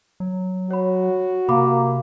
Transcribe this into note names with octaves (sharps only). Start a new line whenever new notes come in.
F#3
F#4 C#5 B5
C3 A#3 B5 D6